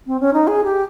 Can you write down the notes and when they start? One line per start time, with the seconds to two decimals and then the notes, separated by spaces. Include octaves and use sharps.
0.07 C4
0.20 C#4
0.33 D#4
0.47 G#4
0.64 G4